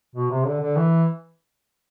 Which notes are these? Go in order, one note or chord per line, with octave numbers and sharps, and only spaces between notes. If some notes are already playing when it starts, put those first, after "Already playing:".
B2
C3
D3
D3
E3